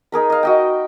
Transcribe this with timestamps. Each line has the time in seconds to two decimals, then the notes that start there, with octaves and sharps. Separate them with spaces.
0.12 D#4 G#4 A#4 B5
0.30 D#5 F5
0.43 F#4 D#5 G5